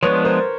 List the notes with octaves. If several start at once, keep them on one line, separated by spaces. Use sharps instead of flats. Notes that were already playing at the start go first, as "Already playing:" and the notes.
F3 G#3 B3 D4 B4 C#5
A#4 C5